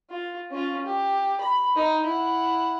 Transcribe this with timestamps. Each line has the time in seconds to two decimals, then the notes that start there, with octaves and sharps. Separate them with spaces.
0.10 F4
0.51 C#4 F4
0.86 G4
1.41 B5
1.75 D#4
2.06 E4 F#5